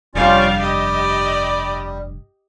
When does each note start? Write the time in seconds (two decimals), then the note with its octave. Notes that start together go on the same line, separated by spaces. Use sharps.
0.15 F1 G2 G3 C#4 F4 D5 F5
0.59 G3 G4 D5 D#5